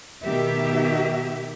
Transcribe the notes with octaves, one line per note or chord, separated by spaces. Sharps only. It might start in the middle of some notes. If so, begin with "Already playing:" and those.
B2 D#3 G4 E5